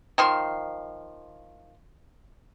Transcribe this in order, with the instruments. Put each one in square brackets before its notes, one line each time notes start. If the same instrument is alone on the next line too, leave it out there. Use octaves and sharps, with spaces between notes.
[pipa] D#3 F3 C6